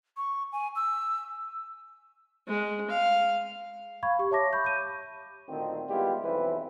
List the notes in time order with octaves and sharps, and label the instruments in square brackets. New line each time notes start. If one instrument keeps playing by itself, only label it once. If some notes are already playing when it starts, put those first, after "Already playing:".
[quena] C#6
G#5
E6
[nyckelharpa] G#3
F5
[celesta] F5 B5 C#6 G#6
G4 C#6
C#5 E5 A5 D6 A#6
B5 C#6 G6
G6 D#7
[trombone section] D2 A#2 D#3 C4
G3 G#3 B3 E4 F4 G4
B1 F2 E3 C4 E4 B4